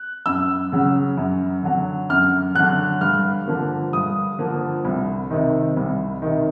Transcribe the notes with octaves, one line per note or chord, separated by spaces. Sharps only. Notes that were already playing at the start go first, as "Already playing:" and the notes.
Already playing: F#6
F#2 E6
C#3 F#3
F#2
D3 F#3
F#2 F6
D3 F#3 F#6
G2 F6
D3 F3 A#3
G2 D#6
D3 F3 A#3
C2
C3 D#3
C2
C3 D#3